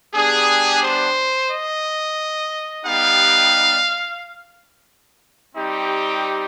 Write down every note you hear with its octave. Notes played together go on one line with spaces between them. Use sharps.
G3 B3 D4 G4 G#4
C5
D#5
G3 B3 D#4 G4 F5
G3 C4 D#4 G4